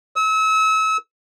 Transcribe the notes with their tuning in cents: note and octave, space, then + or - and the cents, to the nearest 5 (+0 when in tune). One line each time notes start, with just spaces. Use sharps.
E6 -35